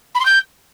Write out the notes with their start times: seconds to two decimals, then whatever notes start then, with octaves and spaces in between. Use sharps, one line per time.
0.14 B5
0.20 C6
0.25 G6